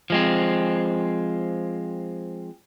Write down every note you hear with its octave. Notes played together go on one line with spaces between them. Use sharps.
F3 G#3 C4